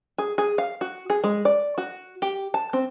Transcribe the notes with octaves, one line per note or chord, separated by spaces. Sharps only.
G#4
G#4
F5
F#4
G#4
G#3
D5
F#4
G4
A5
C4